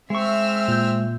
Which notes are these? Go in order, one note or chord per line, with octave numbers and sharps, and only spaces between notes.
G#3 C4 E5 C#6 E6 F6
A#2 G6